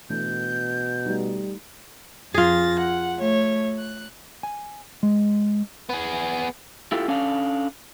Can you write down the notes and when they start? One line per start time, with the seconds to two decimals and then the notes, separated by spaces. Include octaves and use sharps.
0.10 B2 E3 A3 D4 G6
1.06 G3 A3 D#4
2.34 F2 F4 G#4 A6 A#6
2.81 F#5
3.17 A3 C#5
3.79 F#6
4.43 G#5
5.03 G#3
5.90 B3 G#4
6.92 E4 F4 G4 A4
7.08 C#4 D4 A4 F5